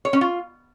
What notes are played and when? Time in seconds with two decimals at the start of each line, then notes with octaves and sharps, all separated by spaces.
0.05 C#5
0.13 C#4
0.21 F4